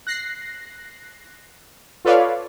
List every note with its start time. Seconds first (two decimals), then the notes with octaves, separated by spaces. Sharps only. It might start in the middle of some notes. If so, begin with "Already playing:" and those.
0.07 F#6 A#6 C7
2.05 F4 A4 B4 C#5 D5 F5